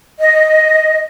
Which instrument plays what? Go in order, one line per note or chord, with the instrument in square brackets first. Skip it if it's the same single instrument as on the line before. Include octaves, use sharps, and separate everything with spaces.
[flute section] D#5